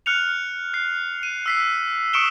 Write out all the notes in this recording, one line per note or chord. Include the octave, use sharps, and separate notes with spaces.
F6 F#6 C#7 F7
F#6 C7
D#7
E6 B6 C7
C#6 D#6 C#7 D7 E7 G7